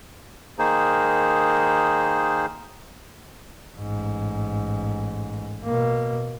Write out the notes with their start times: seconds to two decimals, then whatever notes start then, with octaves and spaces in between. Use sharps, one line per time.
0.59 D#3 A#3 D#4 G#4 C5
3.78 A1 G#2
5.64 B2 A#3